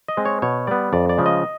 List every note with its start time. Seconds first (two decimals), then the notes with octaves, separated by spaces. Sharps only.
0.08 D#5
0.17 G#3 C4
0.25 C#5
0.42 B2 C#5
0.67 G3 B3 D5
0.93 F2 D5
1.09 D5
1.18 C#3 F3 G#3
1.26 D#5